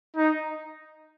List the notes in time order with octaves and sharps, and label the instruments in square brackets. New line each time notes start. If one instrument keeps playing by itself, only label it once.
[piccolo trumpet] D#4